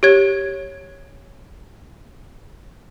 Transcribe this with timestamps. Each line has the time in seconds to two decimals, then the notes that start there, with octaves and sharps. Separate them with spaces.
0.03 G4 C#5 G#6